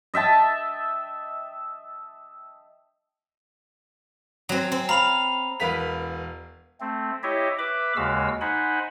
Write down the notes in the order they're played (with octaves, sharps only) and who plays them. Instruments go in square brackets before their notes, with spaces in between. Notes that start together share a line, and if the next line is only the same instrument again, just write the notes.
[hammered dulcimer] D#5 E5 G5 A5
[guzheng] F#3 C4
C4
[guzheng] F5 [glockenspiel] A#5 B5 F7
[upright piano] E1 A#4 B4 F5 B6 F7
[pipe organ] A3 C4
E4 G4 C#5 D#5 E5
B4 E5 B5 D6
D#2 C#3 G#3 F#4 F5 E6
D#4 C5 F#5 G#5 B5